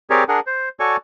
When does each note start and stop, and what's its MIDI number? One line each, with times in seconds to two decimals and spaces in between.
0.10 0.24 60
0.10 0.24 67
0.10 0.24 68
0.10 0.24 70
0.10 0.24 73
0.10 0.24 74
0.29 0.40 62
0.29 0.40 68
0.29 0.40 70
0.29 0.40 78
0.47 0.69 72
0.80 0.97 66
0.80 0.97 69
0.80 0.97 73
0.80 0.97 74
0.80 0.97 80
0.80 0.97 85